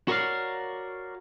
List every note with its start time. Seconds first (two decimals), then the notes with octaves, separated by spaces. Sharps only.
0.08 F#4 A#4 C#5 D5 F5